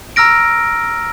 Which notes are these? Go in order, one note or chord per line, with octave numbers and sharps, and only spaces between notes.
A#5 E6 F6 A#6 D7